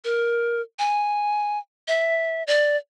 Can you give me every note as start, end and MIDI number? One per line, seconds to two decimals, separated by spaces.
0.04 0.61 70
0.79 1.58 80
1.88 2.43 76
2.47 2.76 74